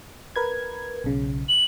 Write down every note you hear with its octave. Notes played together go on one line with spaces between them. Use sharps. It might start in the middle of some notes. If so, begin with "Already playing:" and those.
A#4 B4 G#6
B1 C#3
F#7